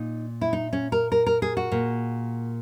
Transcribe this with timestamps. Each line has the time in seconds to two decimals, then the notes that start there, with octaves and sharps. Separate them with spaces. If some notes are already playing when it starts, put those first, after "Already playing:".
Already playing: A#2 D#4
0.41 E4
0.53 D#4
0.73 C#4
0.92 A#4
1.12 A#4
1.26 A#4
1.42 G#4
1.57 F#4
1.71 A#2 A#3